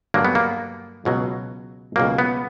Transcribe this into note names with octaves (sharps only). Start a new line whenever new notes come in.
G2 D3 F#3 A#3
B3
A#3
C#2 B2 F#3
C#2 B2 F#3 A#3
B3